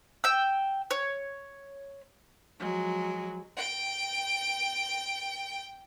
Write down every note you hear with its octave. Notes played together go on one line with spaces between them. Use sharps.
G5 E6
C#5
F3 F#3 G#3
G5 D7